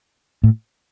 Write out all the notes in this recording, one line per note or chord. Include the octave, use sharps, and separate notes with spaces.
A2